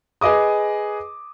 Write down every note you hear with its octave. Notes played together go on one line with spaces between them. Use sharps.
G#4 B4 D#5 D6 D#6